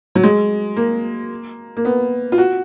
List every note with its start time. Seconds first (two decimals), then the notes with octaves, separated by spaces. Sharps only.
0.15 F#3
0.23 G#3
0.77 A#3
1.77 A#3
1.85 B3
2.32 F4
2.38 F#4